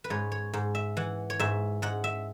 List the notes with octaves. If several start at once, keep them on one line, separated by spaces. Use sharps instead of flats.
B4
G#2 C#5
C#5
G#2
E5
E3 F#5
C#5
G#2 E5
G#2 F#5
E5